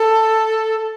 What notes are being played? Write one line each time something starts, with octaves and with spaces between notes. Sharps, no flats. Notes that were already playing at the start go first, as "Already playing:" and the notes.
Already playing: A4